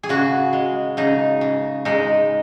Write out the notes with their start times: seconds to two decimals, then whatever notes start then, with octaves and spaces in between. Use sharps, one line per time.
0.03 G#4
0.09 C#3 F#4
0.53 G#3
0.97 C#3 D#4
1.41 C#3
1.85 G#3 D#4